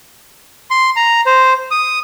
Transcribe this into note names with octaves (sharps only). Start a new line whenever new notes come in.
C6
A#5
C5
D#6